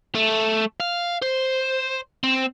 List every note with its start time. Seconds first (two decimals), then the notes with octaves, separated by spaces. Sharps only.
0.15 A3
0.80 F5
1.22 C5
2.23 C4